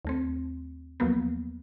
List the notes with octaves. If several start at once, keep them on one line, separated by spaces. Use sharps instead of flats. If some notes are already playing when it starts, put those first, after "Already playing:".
D#2 A3 C4
D#2 F3 F#3 A#3 B3